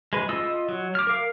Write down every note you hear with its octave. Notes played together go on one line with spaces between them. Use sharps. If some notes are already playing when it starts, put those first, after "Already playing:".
G#3 B4
F4 D#5 D#6 E6
F#3
D6 F6
A#4 F5